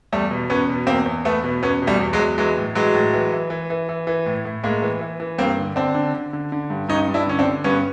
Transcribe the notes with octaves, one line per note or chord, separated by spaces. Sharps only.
E2 G3 A3
B2
E2 B3 C#4
B2
E2 A#3 C4
E2
E2 A3 B3
B2
E2 B3 C#4
B2
G3 A3
E2
F#3 G#3
E2
E3 F#3 G#3
A2
E3 F#3 G#3
A2
E3
E3
E3
E3
E3
E3
A2
A2
A2 G#3 A#3
E3
E3
E3
G2 A#3 C4
D3
D3 C4 D4
D3
D3
D3
D3
G2
G2 C#4 D#4
G2
D4 E4
D3 C#4
C4 D4
D3
G2 B3 C#4